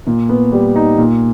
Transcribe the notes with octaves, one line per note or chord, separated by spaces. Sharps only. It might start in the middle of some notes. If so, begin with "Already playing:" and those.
A#2
B3
G3
D#4
A#2